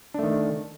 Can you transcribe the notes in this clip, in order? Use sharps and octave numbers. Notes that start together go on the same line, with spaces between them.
D#3 A3 D4